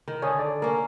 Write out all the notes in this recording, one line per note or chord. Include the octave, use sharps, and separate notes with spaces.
D#3
D3 C#5 G#5 D#6
A4 D5
A#3 C#4 A#4